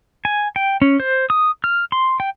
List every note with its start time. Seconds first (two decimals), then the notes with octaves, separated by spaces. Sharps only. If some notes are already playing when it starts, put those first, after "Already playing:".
0.25 G#5
0.56 G5
0.82 C#4
1.00 C5
1.30 D#6
1.64 F6
1.92 C6
2.20 G5